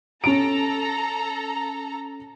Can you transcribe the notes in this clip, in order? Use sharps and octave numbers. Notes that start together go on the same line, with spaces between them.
C#4 A4 A#5 D7